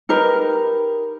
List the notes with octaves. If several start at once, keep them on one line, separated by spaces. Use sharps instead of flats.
D#4 G4 A#4 B4